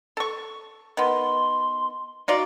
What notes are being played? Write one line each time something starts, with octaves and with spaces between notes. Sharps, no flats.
A4 C#6
D#3 B3 C6
D#4 F4 F#4 D5